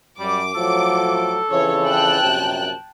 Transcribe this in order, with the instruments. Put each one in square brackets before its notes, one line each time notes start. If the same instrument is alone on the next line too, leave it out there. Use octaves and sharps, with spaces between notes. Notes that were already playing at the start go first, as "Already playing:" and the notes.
[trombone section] F#2 [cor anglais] G3 [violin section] D6
[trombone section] A2 F3 F#3 [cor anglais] A4
[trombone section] F2 C#3 E3 [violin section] C#5
[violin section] G5 A5 F#6
[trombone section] A#1 F#2 C3